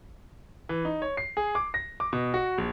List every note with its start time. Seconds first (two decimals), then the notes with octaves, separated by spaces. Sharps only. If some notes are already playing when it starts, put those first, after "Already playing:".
0.69 E3
0.85 D#4
1.02 C#5
1.17 C7
1.37 G#4
1.55 D6
1.74 A#6
2.00 D6
2.13 B2
2.34 F#4
2.58 A#1